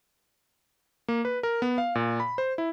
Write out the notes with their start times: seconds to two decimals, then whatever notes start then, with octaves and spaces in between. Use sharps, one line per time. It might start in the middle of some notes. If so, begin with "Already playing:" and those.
1.08 A#3
1.25 B4
1.43 A#4
1.62 B3
1.78 F5
1.95 A#2
2.20 B5
2.38 C5
2.58 E4